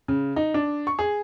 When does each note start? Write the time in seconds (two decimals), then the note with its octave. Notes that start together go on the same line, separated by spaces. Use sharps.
0.08 C#3
0.36 D#4
0.54 D4
0.87 C#6
0.99 G#4